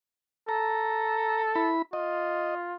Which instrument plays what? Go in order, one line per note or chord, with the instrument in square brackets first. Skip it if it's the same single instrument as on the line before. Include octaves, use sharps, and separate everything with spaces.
[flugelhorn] A4 [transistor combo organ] A#5
[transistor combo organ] E4 B5
[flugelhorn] F4 [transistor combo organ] D#5